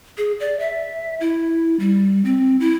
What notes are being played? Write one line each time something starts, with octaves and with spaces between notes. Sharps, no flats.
G#4
D5
E5
E4
G3
C4
E4